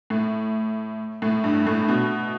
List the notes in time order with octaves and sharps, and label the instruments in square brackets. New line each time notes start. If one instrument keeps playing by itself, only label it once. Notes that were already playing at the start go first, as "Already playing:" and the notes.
[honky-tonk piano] A2
A2
G2
A2
B2